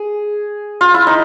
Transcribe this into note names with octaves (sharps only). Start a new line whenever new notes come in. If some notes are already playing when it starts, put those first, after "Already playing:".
Already playing: G#4
F4
E4
D#4